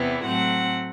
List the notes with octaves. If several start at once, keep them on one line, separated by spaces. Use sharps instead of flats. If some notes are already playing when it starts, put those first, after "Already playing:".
Already playing: E2 C3 E3 B3 E4
A2 F#3 A3 C4 F#5